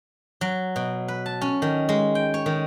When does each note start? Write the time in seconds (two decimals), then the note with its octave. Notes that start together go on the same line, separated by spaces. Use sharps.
0.41 F#3
0.76 B2
1.08 B4
1.26 A5
1.41 C#4
1.62 D#3
1.89 G#3
2.15 G5
2.34 C#5
2.46 D#3